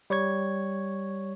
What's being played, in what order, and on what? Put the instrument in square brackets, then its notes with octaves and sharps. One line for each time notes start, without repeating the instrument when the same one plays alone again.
[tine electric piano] G3 C#5 C#6 G#6